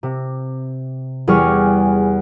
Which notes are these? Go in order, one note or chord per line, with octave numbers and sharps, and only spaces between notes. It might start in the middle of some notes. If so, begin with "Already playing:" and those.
C3
E2 G3 G#4 G#5 C#6 F6